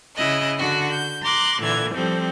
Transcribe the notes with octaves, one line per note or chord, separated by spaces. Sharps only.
C#3 E4 D#5 F#6
D3 F#4 F#5
G6
A#5 C6 D6 F#6
A#2 D3 E3 G#6
F3 G3 C4 A4